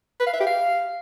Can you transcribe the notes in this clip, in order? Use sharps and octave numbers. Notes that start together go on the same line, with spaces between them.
B4
F5
E5
G4
F5